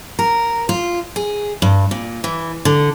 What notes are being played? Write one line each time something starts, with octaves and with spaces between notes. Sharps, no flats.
A#4
F4
G#4
G2
A#2
E3
D3